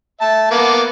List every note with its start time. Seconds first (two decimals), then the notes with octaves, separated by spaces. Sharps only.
0.21 E5 A5
0.51 A#3 B3 D6